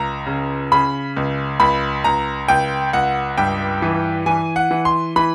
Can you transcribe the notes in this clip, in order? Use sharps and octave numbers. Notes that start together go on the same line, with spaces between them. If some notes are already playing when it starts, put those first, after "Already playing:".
Already playing: C#2 A#5
C#3
C#3 B5
C#2
C#2 B5
C#2 A#5
C#2 G5
C#2 F#5
G2 G5
E3
E3 G#5
F#5
E3
C6
E3 B5